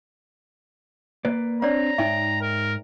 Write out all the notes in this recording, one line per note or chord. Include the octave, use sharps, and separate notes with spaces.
A#3 B4 D5
C4 D4 C#5 D5 A#5
G#2 D#4 E5 G5
A#4